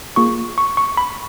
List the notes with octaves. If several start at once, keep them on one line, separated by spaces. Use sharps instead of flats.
A#3 F4 G#4 C#6
C#6
C#6
B5